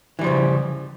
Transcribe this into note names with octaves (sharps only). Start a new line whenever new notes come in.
C#3 E3 F3 G3